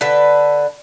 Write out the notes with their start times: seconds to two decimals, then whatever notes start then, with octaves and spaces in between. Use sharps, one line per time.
0.01 D3 A4 B4